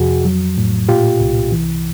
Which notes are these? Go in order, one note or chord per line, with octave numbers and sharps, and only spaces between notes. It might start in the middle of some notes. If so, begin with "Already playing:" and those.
Already playing: F2 C3 F#4 G#4
F#3
A2
A#2 F4 G4
C2
E3